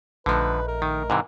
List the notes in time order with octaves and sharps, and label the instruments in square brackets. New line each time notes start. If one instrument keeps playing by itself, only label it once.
[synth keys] A#1 A3 D#4 [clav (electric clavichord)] D3 F3 [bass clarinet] B4
[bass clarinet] A#4
[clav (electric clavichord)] D#3
G#2 C3 E3